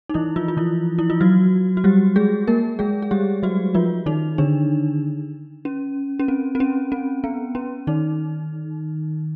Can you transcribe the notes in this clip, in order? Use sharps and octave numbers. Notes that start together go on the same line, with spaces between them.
D#4
E3 E4
F3 F4
F4
E3 E4
E4
F4
F#3 F#4
F#4
G3 G4
G#3 G#4
A#3 A#4
G#3 G#4
G#4
G3 G4
F#3 F#4
F3 F4
D#3 D#4
D3 D4
C#4
C#4
C4
C4
C#4
C4
B3
C#4
D#3 D#4